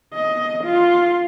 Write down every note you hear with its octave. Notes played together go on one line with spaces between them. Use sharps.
D#5
F4